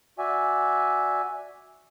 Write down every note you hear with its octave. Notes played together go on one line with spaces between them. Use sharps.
F#4 D5 E5 G#5